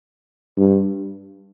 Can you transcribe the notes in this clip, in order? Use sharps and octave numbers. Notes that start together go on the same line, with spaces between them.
G2